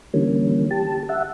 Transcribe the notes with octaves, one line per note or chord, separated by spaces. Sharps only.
D3 E3 G3 A#3 C#4
G4 A5
E5 F#5